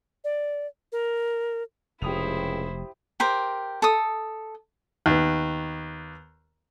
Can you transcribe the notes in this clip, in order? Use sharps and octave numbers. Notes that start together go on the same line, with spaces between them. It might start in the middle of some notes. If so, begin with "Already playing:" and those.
D5
A#4
F1 C#2 E4 G4 C5 D#6 F7
G4 A#4 C5
A4 D#6
D#2 B3